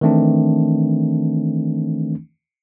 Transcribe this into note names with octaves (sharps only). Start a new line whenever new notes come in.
D#3 E3 A3 C4 D4